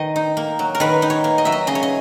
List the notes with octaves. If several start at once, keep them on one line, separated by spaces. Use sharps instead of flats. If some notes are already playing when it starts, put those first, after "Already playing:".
Already playing: D#3 D#5
D#4
A#3
F#3
A#4
D#3 B4
D#4
C#5
A#3
D#5
F#3 E5
D#5
C#3 D#5
C#5
D#5